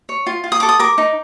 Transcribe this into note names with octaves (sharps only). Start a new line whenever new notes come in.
C#5
F4
F4
D#6
A4 D6
D#6
A#4 D6
D#4